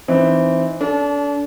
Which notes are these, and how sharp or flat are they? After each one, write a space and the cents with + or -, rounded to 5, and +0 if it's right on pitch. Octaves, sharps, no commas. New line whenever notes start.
E3 +0 C4 +0 D#4 -15
D4 -35 A4 -10